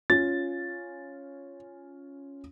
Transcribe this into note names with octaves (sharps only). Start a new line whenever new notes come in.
C#4 F4 A6